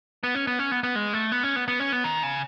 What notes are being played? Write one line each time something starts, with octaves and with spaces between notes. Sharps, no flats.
B3
C#4
B3
C#4
B3
B3
G#3
A3
B3
C#4
B3
B3
C#4
B3
D#3
C#3